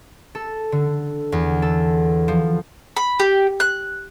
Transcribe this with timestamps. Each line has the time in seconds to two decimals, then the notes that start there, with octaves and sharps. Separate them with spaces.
0.35 A4
0.72 D3
1.32 E2
1.62 A4
2.28 F3
2.97 B5
3.20 G4
3.60 F#6